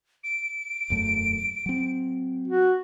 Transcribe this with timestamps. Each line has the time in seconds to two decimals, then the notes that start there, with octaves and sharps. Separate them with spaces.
0.24 D7
0.90 E1 F#2 A3
1.66 F#3 C4
2.48 F#4